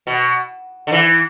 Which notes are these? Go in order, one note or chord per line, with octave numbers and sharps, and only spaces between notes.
B2
D3
E3